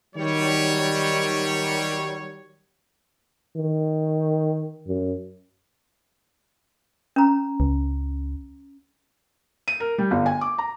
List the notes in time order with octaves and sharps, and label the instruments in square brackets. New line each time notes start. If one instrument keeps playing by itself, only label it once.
[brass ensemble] D#3 F#3 G3 C#5
[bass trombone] D#3
F#2
[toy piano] C#4 A#5
[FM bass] C#2
[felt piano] D#7
A#4
G3
G1
G#5
D6
A#5